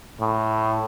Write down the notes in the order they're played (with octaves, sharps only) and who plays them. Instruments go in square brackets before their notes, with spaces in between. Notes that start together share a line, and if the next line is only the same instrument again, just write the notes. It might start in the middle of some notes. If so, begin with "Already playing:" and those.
[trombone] A2